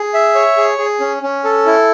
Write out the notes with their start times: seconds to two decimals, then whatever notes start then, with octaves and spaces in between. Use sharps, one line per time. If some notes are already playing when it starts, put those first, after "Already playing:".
Already playing: G#4
0.14 E5
0.35 C#5
0.57 G#4
0.78 G#4
1.00 C#4
1.23 C#4
1.44 A4
1.66 E4